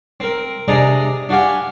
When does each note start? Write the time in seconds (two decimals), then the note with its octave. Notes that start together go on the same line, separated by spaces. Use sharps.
0.20 C4 A#4
0.68 C3 D4 G#4 D5 D#5 A#5
1.29 D4 F#4 G4 F5 G#5